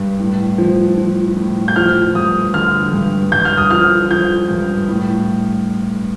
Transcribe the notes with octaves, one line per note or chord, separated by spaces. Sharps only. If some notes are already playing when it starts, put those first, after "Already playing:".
Already playing: G2
A2
F3
F3
A2
G6
F3 F6
G2 D#6
D3 F6
G2
G2 G6
F6
D#6
F3 F6
F3 G6
G2
A2